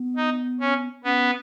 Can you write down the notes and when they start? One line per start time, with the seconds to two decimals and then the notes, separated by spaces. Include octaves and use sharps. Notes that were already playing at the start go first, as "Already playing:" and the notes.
Already playing: B3
0.16 D#4
0.61 C#4
1.04 B3 C#4